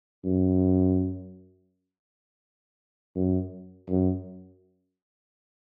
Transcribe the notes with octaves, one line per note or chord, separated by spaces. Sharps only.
F#2
F#2
F#2